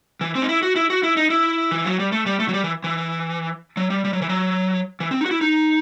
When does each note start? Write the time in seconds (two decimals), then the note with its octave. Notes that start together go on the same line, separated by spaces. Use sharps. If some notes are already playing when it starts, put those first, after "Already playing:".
0.21 E3
0.35 C4
0.42 D#4
0.49 E4
0.63 F#4
0.76 E4
0.90 F#4
1.03 E4
1.17 D#4
1.30 E4
1.71 E3
1.85 F#3
1.99 G3
2.12 A3
2.26 G3
2.40 A3
2.48 F#3
2.54 G3
2.64 E3
2.84 E3
3.77 F#3
3.90 G3
4.05 G3
4.13 F#3
4.22 E3
4.29 F#3
5.00 E3
5.11 C4
5.21 D#4
5.26 F#4
5.31 E4
5.41 D#4